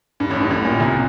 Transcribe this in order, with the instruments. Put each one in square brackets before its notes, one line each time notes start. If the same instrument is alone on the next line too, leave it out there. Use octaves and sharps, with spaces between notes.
[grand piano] G2
A1 A2
G2
A1 A2
A#1 A#2
C2 C3
A#2